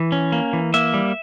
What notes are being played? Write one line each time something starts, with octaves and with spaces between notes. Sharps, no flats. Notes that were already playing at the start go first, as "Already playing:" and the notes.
Already playing: E3
C#4
A#3
E3
A#3 E5
G3